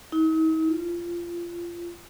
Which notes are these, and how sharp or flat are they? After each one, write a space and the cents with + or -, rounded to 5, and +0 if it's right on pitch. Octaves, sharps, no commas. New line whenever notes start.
D#4 +45
F4 -20